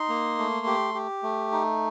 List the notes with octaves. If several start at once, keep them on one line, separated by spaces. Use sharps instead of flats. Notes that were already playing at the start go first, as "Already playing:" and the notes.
Already playing: D#4 C6
A#3
A3
G4
G4
A3
D#4